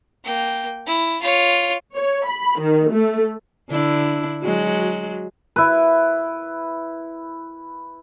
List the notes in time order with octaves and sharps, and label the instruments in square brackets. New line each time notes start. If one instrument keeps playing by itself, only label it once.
[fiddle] A#3 G5
E4
F4 C#5
[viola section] C#5
B5
D#3
A3
[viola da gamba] D3 D4 E4
F#3 G#3 F#4
[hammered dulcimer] E4 B4